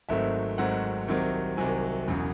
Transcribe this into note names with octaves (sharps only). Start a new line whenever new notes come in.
G#1 G#2 F#3 A3 C4 E5
G#1 G#2 F#3 A3 C4 F#5
C2 C3 D#3 F#3 C4
C2 C3 D#3 F#3 C4 G#5
E1 E2 C#3 F#3